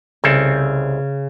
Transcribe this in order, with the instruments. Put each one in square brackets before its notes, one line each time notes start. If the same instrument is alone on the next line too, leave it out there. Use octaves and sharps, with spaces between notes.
[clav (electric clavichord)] C2 C4 A4 [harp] C#3